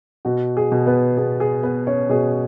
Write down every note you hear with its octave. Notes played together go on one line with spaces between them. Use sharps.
B2 F#4
G#4
B2
B3 B4
B3 G#4
G#4
B3 B4
C#4 C#5
B2 G#4